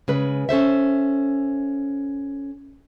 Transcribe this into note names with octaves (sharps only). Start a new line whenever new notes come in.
C#3 G#3 B4
C#4 A4 C5 E5